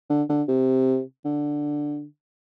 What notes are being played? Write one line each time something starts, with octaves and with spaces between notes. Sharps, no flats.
D3
D3
C3
D3